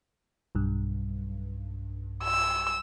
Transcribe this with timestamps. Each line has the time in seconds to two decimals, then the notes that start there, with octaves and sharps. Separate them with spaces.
0.55 B1 G2
2.25 E6